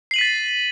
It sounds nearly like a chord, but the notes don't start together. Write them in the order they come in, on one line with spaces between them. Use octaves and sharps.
C7 F#7 D#7 B6 A6